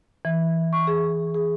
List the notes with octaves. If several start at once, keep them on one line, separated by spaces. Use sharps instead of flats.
E3
C#6
G#4
G#4